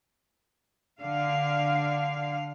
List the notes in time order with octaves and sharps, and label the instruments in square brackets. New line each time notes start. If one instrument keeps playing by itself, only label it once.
[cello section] D3 F5